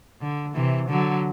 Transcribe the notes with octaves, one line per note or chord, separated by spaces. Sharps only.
D3
C3 E3
D3 F#3